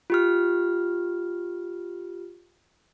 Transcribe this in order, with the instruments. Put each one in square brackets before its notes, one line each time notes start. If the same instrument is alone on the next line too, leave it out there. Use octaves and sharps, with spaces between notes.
[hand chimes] F4 G4 F6